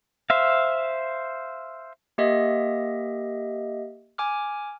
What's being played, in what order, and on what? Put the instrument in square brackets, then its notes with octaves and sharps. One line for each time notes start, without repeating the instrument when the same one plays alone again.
[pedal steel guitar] C5 E5 F5
[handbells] A#3 G4 D#5 E5
G#5 D6 F6